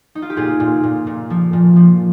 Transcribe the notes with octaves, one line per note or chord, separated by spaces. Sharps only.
D#4
F4
G4
A#2 F4 G#4
A#2
A#2
A#2
F3
A#2
F3